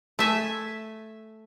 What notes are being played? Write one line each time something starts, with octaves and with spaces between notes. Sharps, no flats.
A3 E5 G#5